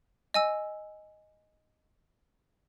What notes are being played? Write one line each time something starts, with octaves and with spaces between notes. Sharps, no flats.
D#5 G#5 E6